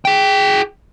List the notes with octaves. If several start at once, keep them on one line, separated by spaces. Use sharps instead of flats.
G#4 G5